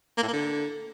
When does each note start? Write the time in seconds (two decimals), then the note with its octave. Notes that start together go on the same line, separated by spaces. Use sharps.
0.17 A#3
0.23 A2
0.28 A#3
0.33 D3